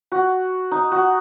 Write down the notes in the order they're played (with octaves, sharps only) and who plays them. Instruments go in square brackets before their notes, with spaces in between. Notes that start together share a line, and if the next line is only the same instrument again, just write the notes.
[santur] F#4
D#4
F#4